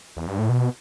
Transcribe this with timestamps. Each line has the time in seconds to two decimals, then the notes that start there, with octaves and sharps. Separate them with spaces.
0.17 E2
0.27 G2
0.39 A2
0.49 B2